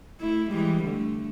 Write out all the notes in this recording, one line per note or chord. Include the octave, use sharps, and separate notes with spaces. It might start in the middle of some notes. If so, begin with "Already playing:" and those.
A3 E4
E3 G3 G#3
D3 A3